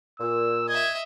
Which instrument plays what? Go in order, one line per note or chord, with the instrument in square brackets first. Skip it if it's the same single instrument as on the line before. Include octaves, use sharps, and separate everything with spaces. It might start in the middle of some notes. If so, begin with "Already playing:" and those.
[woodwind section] A#2 [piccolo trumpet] E6
[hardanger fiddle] D#5 E5 [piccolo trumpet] G#6